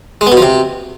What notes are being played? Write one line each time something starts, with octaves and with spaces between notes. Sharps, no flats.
G#3
B3
B2
F3
C3